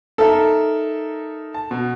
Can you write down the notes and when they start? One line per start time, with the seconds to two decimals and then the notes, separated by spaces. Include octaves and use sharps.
0.18 D#4 A4 A#4 E5
1.54 A5
1.71 B2